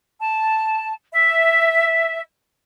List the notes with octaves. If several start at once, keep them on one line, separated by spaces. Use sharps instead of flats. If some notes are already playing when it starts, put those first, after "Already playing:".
A5
E5